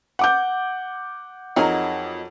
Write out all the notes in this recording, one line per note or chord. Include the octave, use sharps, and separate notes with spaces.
F#5 D6 G6
F2 F#3 D#4 G#4 A#4